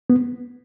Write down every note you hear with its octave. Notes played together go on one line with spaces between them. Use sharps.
B3